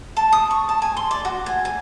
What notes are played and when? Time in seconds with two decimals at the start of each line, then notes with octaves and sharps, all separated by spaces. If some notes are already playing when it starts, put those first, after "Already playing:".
0.17 A5
0.33 D#6
0.51 C#6
0.69 A5
0.82 G#5
0.97 C6
1.11 D5
1.25 F#4
1.46 G#5
1.65 G#5